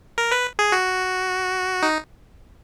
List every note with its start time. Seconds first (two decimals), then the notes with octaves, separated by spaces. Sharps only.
0.18 A#4
0.32 B4
0.59 G#4
0.72 F#4
1.83 D#4